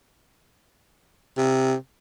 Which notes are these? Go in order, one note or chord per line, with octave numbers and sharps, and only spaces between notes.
C3